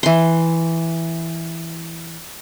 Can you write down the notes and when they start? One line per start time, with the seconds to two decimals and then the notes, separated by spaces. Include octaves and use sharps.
0.03 E3 C6